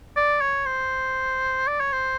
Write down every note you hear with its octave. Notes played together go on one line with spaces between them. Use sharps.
D5
C#5
C5
D5
C#5
C5